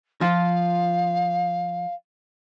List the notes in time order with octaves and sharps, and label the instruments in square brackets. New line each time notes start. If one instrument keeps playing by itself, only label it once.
[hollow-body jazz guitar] F3 F4 [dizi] F5